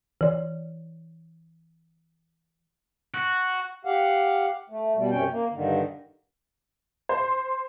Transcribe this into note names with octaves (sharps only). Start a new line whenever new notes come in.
E3 D5
F#4
G4 F5 F#5
A3
B2 G3
F#2 C3 C#4 G5
A#3
G2 D3 D#3
C5